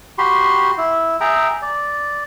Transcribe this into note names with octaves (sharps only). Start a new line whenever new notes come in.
F#4 G4 B5 C6
E4
G#4 E5 G5 A#5
D5